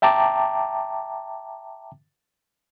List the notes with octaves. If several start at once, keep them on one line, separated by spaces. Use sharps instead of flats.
E5 G5 A5 A#5 D6